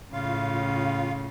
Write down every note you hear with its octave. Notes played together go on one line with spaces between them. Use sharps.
A2 C#3 F4 F5